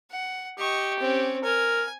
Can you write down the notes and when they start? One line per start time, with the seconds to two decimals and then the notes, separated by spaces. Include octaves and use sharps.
0.11 F#5
0.59 G4 D#5 C#6
0.99 C4 C#4
1.44 A#4 G#5